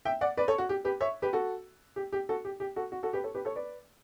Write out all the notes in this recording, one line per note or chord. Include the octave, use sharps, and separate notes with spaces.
E5 G5
D5 F#5
B4 D5
A4 C#5
F#4
G4
G4 B4
C#5 E5
G4 B4
F#4 A4
G4
G4
F#4 A4
G4
G4
F#4 A4
F#4
F#4 A4
G4 B4
A4 C#5
G4 B4
A4 C#5
B4 D5